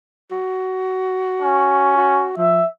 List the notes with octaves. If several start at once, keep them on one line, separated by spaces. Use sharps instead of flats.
F#4
C#4
F#4
F3 E5